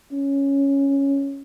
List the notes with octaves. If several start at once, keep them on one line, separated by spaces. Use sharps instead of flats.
C#4